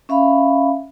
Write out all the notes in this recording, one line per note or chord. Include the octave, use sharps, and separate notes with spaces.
C#4 E5 F5 B5